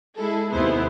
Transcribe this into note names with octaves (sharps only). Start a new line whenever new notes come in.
G#3 E4 G#4 A4
D#2 C3 B3 E4 G#4 C5